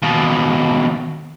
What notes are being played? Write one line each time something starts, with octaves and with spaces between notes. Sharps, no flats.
D#2 B2